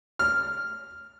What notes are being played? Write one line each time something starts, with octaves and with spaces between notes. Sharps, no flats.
F6